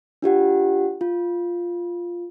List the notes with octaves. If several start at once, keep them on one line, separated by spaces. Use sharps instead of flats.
D4 F4 G4 F#5
F4